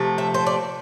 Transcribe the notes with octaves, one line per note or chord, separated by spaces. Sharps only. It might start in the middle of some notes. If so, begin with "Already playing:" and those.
Already playing: C3 F3 A3
E5
C5
D5